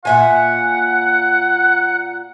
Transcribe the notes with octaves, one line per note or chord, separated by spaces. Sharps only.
A#2 E5 F#5 G#5